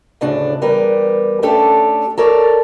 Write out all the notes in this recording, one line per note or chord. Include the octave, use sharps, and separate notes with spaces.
D2 A2 C#3 D4
E2 G3 A#4 B4
A3 C#4 D4 G4 A4
A4 A#4 C#5 D5